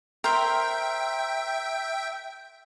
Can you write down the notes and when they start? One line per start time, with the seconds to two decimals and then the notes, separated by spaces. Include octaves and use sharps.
0.24 A#4 C5 E5 G5